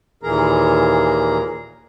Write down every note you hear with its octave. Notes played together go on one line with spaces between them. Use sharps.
D#2 A#2 E3 G#4 A#4 A#5